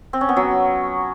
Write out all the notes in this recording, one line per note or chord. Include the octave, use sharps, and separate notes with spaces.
C4
C#4
B3
F#3